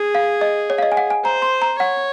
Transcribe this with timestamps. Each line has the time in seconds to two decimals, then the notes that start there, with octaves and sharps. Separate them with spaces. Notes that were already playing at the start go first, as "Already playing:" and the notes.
Already playing: G#4
0.15 F5
0.41 D#5
0.70 C#5
0.78 F5
0.83 D#5
0.92 G#5
0.97 F#5
1.10 G#5
1.24 C5 A#5
1.42 C6
1.62 A#5
1.79 C#5 F#5